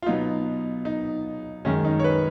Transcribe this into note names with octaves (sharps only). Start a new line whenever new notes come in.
F4
B2 F#3 B3 D#4
D#4
F#2 D#3 G#3 C#4
D#4
C#5
B4